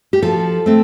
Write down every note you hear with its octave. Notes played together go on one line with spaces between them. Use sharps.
G4
F3 A4
A3 C4